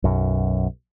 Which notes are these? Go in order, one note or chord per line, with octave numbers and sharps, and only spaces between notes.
B1 F#2